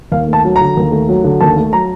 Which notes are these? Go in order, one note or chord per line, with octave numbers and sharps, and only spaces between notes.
D#2 F5
A3
A5
F#3
A#5
D3
D#2
A3
F#3
D3
D#2 A5
A3
F#3 A#5